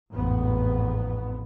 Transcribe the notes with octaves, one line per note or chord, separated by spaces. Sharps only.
A1 F2 G#2 B3